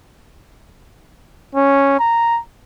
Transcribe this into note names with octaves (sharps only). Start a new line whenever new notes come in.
C#4
A#5